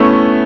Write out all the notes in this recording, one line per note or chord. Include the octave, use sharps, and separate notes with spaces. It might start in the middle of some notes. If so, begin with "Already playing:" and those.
Already playing: A3 B3 C#4 E4